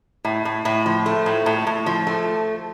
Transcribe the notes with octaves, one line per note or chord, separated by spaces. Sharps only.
A2
A2
A2
F3
A3
A2
A2
A2
F3
A3